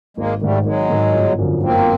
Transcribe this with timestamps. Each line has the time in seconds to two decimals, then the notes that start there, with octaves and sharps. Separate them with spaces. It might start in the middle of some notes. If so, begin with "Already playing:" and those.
0.17 G#1 G#3 A#3
0.41 G#2 D#3 G3 A3
0.65 G#1 F#3 G#3
0.90 G#2 D#3
1.14 G1
1.39 F#2 D3 F3
1.62 G1 A#3 C4